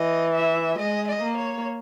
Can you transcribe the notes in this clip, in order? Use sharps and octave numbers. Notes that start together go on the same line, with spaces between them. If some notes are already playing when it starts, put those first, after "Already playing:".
Already playing: E3 D#5
E5
G#3 D#5
D#5
A#3
C#5